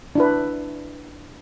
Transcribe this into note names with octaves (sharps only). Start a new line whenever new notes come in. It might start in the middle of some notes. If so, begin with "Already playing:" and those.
D4 E4 B4